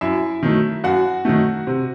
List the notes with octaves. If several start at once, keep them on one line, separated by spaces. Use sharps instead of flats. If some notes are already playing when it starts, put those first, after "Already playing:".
F#2 E4 E5
D#3 F#3 A3
F#2 F#4 F#5
D#3 F#3 A3
C3